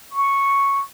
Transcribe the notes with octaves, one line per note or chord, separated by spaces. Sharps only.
C#6